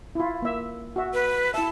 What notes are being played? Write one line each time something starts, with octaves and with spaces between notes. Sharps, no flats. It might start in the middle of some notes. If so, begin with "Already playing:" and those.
E4 F4
A#3 E5
F#4 E5
B4
E4 E5 A5